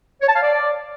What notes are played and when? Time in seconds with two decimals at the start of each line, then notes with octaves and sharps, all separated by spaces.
0.21 C#5
0.28 A5
0.35 F5
0.42 D5